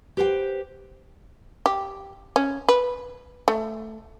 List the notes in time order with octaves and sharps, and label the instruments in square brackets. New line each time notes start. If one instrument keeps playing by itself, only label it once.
[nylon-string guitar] G4 B4 C5 F5 G5
[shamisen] G4
C#4
B4
A3